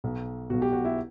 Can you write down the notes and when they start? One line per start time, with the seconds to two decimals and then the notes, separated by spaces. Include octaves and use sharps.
0.04 B1 B2
0.50 B1 B2 F#4
0.62 G4
0.73 F#4
0.85 E4